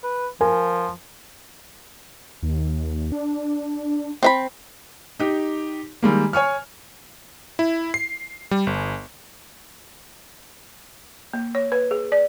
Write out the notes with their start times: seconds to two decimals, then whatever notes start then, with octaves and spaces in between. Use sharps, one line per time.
0.03 B4
0.41 F3 A#4 G#5
2.42 D#2
3.12 D4
4.23 C4 E5 B5
5.19 D#4 G4
6.02 D#3 G3 G#3 A#3
6.33 C#5 G#5 C#6 F6
7.59 E4
7.94 C7
8.51 G3
8.67 G1
11.33 A#3
11.55 C#5
11.72 B4
11.91 G#4
12.12 D5